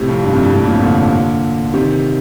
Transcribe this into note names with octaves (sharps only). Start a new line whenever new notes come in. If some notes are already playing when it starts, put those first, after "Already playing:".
Already playing: A2 C3
F2
G2
F2 A2
G2
F2 A2
G2 A#2
A2 C3
A#2 D3
C3 D#3